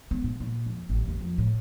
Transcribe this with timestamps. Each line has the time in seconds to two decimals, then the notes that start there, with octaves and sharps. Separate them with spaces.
0.11 B3
0.24 A#2
0.40 A#2
0.66 F2
0.90 A1
1.08 D#2
1.21 F2
1.38 A2